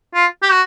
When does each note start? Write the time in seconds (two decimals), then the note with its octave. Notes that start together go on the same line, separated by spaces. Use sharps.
0.14 F4
0.43 G4
0.51 F#4